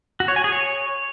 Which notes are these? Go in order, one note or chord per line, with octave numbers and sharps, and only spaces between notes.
F#4
C#5
G#5
G#4
C#5